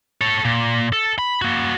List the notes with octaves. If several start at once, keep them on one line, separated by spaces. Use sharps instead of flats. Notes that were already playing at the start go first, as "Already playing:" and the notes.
A4 C#5
A#2
A4
B5
A#3 F#4